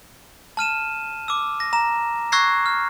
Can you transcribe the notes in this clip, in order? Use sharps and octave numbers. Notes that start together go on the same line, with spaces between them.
A5 F6 D#7 E7
D6 E6
A#6
A#5 E7
C#6 E6 F#6 G#6 A#6 C7
F6